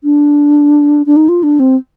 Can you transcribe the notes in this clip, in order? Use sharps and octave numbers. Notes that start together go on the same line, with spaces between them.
D4
D4
D#4
F4
D4
C4